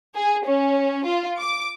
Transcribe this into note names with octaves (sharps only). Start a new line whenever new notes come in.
G#4
C#4
F4
D6